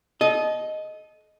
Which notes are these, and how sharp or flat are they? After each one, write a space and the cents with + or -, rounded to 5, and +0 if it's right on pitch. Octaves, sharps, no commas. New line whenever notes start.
A4 -30 D#5 +0